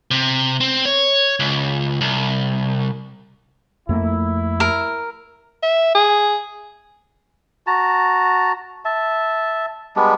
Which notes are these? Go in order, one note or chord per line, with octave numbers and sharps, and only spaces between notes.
C3
C4
C#5
C#2
C2
F2 A3 A#3 E4
A#4
E5
G#4
F#4 A5 A#5
E5 A5
G3 G#3 B3 D4